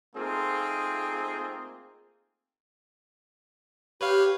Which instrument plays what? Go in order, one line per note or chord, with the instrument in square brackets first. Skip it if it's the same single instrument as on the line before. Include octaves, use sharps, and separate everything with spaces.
[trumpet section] A3 A#3 C4 D#4 F4 G#4
[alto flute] G4 [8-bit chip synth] B4 C#5 F5